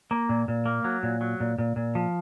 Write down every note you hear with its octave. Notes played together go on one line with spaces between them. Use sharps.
A#3
A#2
A#2
A#3
F#3
A#2
F#3
A#2
A#2
A#2
F3